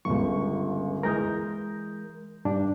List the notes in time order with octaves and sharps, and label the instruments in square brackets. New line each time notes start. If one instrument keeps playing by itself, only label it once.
[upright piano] G1 C#2 [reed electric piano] C#6
[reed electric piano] E3 G#3 A#4 [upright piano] D#6 G6 A#6
[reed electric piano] G2 D4